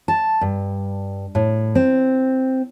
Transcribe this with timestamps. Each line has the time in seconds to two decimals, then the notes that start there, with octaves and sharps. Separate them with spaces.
0.08 A5
0.41 G2
1.35 A2
1.75 C4